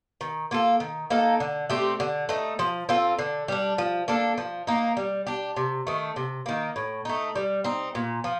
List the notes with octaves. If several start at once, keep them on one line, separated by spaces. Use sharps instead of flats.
D#3
A#3 F4 A4
D#3
A#3 D#4 A4
D3
A3 C4 G4
D3
A3 D#4
F3
C4 F4 A4
D3
G3 D4
F3
A#3 D4 A4
F3
A#3 D#4
G3
D4 G4
C3
D#3 A3
C3
D#3 A#3
A2
A3 D#4
G3
C4 D#4
A#2
F3